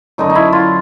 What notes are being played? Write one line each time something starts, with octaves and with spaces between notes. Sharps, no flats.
F#2 D3 F#3 D#4
D#4
E4
F4